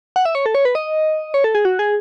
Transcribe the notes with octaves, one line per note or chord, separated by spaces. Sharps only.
F#5
E5
C#5
A4
C#5
B4
D#5
C#5
A4
G#4
F#4
G#4